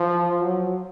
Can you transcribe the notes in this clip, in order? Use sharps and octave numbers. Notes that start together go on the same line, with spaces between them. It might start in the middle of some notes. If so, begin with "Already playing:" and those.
Already playing: F3
F#3